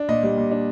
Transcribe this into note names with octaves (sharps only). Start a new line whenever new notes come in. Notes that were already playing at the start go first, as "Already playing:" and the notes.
Already playing: D4
A#2 D#5
G3
A#2
D4